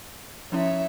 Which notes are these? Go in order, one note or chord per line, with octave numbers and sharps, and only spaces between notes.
F3 C#4 E4 C#5 E5